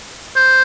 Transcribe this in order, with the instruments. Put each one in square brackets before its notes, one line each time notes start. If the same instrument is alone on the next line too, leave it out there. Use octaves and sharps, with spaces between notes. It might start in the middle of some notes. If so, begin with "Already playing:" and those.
[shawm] C5